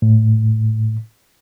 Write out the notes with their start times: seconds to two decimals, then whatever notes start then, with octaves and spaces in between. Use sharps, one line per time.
0.02 A2